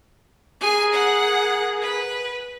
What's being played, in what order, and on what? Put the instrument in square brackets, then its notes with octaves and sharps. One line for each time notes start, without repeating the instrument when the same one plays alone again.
[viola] G#4 A#4 [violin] G#5 C7
[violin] F#5
B4